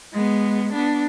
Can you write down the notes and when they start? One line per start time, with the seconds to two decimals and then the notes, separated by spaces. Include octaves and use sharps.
0.12 G#3 B3
0.73 B3 D4